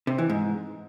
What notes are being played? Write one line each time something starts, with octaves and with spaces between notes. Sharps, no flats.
C3
E3
G#2